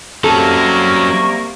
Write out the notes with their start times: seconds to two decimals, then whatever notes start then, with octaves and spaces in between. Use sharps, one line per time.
0.24 C3 F#3 G3 A#3 C#4 A4 C#6